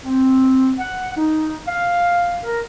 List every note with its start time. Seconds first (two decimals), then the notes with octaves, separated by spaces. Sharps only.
0.03 C4
0.78 F#5
1.17 D#4
1.67 F5
2.43 A#4